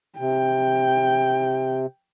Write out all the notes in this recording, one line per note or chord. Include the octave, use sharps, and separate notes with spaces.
C3 G5